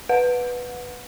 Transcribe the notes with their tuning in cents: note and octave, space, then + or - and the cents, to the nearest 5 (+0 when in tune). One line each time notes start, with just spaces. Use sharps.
B4 +0 F#5 -30